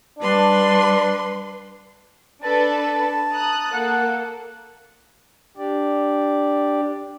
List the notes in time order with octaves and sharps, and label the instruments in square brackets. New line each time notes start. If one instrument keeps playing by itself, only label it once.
[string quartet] G3 B4 C6 [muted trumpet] D4
[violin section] D4 A4 B4 [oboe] A5
[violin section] A#5 D#6 F#6
[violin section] A#3 A4 [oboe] F#5
[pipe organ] D4 G4 D5